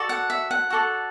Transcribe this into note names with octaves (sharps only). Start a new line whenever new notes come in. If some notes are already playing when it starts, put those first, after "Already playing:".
Already playing: F#4 A4 D5
F#5
E5
F#5
F#4 A4 D5